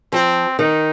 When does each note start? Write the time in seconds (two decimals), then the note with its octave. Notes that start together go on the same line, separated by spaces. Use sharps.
0.12 F3 C4
0.59 D#3 D#4